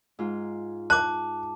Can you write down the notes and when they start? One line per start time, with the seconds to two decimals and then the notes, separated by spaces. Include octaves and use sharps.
0.19 G#2 F4
0.90 A5 D6 F#6